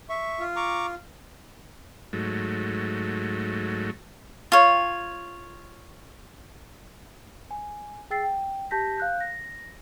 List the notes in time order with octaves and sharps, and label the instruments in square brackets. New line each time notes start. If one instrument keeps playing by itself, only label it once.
[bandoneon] E5 C#6
[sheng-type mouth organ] F4
[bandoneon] A#5 C#6 D6
[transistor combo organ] G#2 F#3 A3
[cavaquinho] F4 C#5
[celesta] G#5
G#4 G5 E6 A6 C7
G5
G4 A5 G6 A#6 B6
F5 F#6 G6
A#6